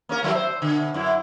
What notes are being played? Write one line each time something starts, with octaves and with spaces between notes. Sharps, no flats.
A#3 C#4 A#4
E3 F#3 A3
C5
B2 D3
F#2 E4